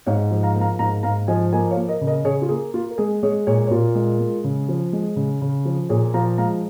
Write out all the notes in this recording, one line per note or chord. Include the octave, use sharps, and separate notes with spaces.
G#2 C#5 F5
F3
F5 A#5
A#3
F5 A#5
G#2 F5 A#5
G#2 F5 A#5
F3 D#5 G#5
A#3 D#5 G#5
C#5 F5
A#3
A#4 D#5
C#3
A#4 D#5
C#3 G#4 C#5
F4
A#3 G#4
A#3 F4
A#4
G#3 G#4
G#3 G#4 C#5
A#2 G#4 C#5
C#5
A#2 F4 A#4
G#3
G#3
C#3
F3
G#3
C#3
C#3
F3
A#2 G#4 C#5
F3 F5 A#5
G#3 F5 A#5